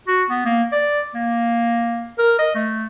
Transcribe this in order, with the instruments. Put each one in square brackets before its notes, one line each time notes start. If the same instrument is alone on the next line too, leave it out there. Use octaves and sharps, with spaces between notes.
[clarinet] F#4
B3
A#3
D5
A#3
A#4
D#5
A3